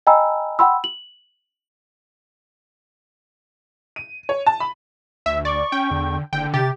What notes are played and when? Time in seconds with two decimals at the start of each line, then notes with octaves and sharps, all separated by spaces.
0.07 D#5 G5 G#5 A#5 B5 E6
0.59 F#5 G5 B5 C6 E6
0.84 F#7
3.96 D#7
4.29 C#5
4.46 A5
4.60 B5
5.26 D2 E5
5.45 D5 C#6
5.72 C#4 G5
5.91 E2 D3
6.33 F#1 D3 G5
6.54 C3 G4 A6